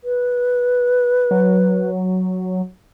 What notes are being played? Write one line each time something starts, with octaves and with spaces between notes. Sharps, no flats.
B4
F#3